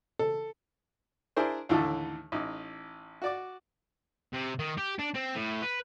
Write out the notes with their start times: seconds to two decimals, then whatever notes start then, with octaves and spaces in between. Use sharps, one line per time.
0.19 A4
1.36 D4 E4 G#4 A#4 C5
1.69 D#2 A2 D3 E3 A3 A4
2.32 A1 D#4
3.22 F#4 D5 D6
4.33 C3
4.59 D#3
4.78 G4
4.99 D4
5.15 C4
5.36 A2
5.62 B4